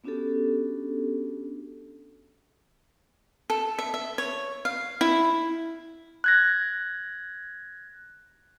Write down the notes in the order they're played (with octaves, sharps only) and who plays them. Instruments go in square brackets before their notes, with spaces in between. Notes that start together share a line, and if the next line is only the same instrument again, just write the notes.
[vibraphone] B3 C#4 D4 F#4 G4 A4
[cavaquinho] A4
E5
E5
C#5
F5
E4
[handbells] F#6 G#6 A#6